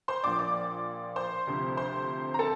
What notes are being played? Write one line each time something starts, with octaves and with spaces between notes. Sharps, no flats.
C5 C6
A#1 A#2 F3 D5 D6
D5 D6
C5 C6
D2 C3 F3
C5 C6
A#5
A4 A5